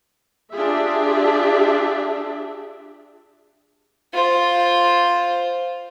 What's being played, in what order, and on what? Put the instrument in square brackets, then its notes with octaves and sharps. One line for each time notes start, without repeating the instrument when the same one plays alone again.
[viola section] D4 F4 G4 G#4 E5
[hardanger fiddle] F4 C5